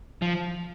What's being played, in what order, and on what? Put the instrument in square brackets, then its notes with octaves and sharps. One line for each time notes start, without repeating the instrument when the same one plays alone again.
[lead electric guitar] F3